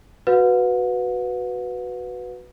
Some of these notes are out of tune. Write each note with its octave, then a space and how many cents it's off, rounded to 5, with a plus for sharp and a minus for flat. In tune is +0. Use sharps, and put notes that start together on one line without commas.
F#4 +0 B4 +0 F#5 -45